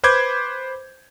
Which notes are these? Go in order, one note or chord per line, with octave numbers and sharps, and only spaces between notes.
B4 C5 B5 D6 G6 G#6